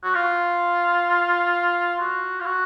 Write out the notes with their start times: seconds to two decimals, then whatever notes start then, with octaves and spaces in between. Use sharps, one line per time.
0.04 F#4
0.15 F4
2.00 F#4
2.40 F4
2.46 F#4